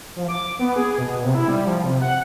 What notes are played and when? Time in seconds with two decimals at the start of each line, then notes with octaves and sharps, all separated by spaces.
0.16 F3
0.29 D6
0.59 B3
0.76 G#4
0.98 B2
1.23 C3
1.35 E4
1.48 G3
1.66 F3
1.84 C3
2.02 F#5